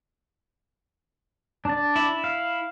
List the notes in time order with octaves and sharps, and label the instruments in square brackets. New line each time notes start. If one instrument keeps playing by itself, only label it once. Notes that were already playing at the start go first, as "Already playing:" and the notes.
[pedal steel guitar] D4 D5
[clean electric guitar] E4
[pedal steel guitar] F5